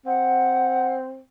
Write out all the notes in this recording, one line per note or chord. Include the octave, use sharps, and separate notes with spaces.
C4 F#5